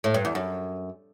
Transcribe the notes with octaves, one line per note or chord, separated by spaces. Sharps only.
A2
G2
E2
F#2